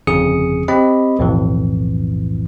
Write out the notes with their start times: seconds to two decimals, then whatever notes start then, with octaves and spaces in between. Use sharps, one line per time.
0.07 G1 F2 C#3 G#4 D#6 C#7
0.68 C4 G4 D#5 B5
1.19 B1 F2 A2 E3